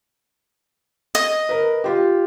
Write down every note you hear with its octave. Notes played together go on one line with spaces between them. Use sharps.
D#5
A#4 B4
F4 G4